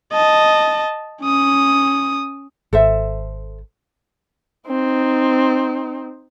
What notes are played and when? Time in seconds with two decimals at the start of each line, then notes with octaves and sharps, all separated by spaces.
0.13 D#5 A5
1.22 C#4 D#6
2.73 G#1 A4 C5 E5
4.68 C4 D#4